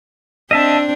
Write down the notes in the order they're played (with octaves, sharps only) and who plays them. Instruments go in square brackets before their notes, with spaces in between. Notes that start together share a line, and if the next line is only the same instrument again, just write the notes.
[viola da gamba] C4 D4 [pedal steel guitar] D#5 E5 A5